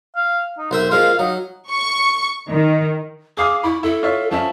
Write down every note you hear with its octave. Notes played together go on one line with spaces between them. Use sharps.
F5
D#4
B1 A#4 C5 E5
F3 G#3 A#3 F5
F#3 D#4
C#6
D#3
G#4 F5 D6 D#6
E4 B5 C#6
E4 A4
F4 C#5 E5
F3 C#4 E5 A5